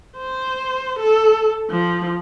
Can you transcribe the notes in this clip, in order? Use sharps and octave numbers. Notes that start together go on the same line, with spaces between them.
C5
A4
F3